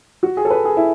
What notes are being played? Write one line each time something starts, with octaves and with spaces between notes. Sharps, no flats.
F#4
G#4
A4
B4
G#4
E4